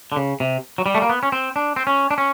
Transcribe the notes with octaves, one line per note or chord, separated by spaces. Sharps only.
D3
C#3
C3
F#3
G3
A3
A#3
B3
C#4
C4
D4
C4
C#4
D4
C#4